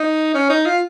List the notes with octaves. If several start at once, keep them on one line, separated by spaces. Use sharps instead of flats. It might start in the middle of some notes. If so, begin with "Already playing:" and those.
Already playing: D#4
C#4
D#4
F4